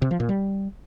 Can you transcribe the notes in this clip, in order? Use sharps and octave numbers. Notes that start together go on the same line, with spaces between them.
C3
F3
A#2
G3